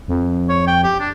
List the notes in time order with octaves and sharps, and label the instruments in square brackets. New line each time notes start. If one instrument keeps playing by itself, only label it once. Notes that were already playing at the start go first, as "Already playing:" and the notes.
[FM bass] F2
[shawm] C#5
G5
G4
D4